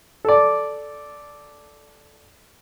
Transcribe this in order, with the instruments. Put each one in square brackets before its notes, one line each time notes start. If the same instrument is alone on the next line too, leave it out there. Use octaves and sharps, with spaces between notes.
[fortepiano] A4 D5